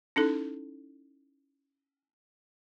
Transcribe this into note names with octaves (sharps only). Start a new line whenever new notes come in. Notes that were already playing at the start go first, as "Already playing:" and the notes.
C#4 D#4 E4 A4